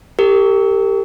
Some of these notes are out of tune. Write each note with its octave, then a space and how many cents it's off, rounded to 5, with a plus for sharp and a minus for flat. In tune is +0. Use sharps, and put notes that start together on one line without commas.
G4 +10 A#4 -45